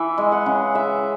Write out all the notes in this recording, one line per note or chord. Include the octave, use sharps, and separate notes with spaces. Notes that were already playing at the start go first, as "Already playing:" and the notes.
Already playing: E3 E5
G#3
F#5
C#3
E3 E5